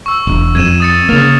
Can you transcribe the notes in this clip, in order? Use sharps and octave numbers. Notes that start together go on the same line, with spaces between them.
C#6 E6
E1
F2 G#6 D#7 E7
D#6 A6 C#7
C#3 A#3 F6 A6 F7